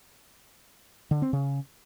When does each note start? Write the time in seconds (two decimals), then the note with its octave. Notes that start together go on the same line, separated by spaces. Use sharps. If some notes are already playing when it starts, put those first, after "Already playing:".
1.11 D3
1.22 C4
1.33 C#3